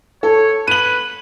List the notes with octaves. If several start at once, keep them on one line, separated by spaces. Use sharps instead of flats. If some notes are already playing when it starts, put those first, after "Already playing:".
A4 C#5
B4 D#7 F#7